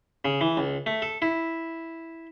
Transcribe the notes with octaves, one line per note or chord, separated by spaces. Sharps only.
C#3
E3
C#2
A3
A4
E4